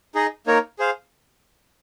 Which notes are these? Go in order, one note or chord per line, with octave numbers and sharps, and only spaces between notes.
D#4 G#4 D#5
A#3 D#4 A#4 C#5
G#4 C5 F5